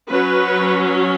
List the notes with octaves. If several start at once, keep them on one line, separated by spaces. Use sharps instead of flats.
F#3 C#4 B4